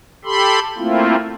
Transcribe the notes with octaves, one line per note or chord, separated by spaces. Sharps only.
G4 A4 B5 C6
A3 A#3 C4 E4 F4